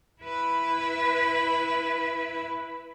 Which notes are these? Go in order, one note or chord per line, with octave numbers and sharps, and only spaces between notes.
E4 B4